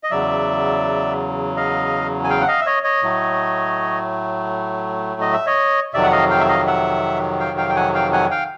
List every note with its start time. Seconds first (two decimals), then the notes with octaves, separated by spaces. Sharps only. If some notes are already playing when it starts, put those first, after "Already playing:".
0.04 D#5
0.11 E2 C#3 F#3 D5 E5
1.57 D#5 F5
2.24 G#5
2.29 F5 G5
2.42 F#5
2.48 D#5 F5
2.61 E5
2.66 C#5 D#5
2.84 C#5 D#5
3.03 A2 F#3 A3
5.21 D#5
5.33 E5
5.46 C#5 D#5
5.94 F2 C3 D#3 F#3 D5 E5
6.03 F#5
6.12 D#5 F5
6.30 F5 G5
6.40 E5
6.49 D#5 F5
6.67 E5 F#5
7.40 F5 G5
7.58 F5 G5
7.69 G5
7.76 F#5 G#5
7.94 F5 G5
8.13 F#5 G#5
8.31 F5 G5